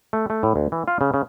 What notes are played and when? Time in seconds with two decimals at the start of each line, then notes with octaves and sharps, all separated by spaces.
0.13 A3
0.30 A3
0.43 A2
0.56 D2
0.72 E3
0.88 F4
1.01 C#3
1.14 C#3